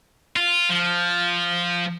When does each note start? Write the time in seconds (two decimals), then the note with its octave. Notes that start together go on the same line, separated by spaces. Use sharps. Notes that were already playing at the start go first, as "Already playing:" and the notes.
0.36 F4
0.70 F3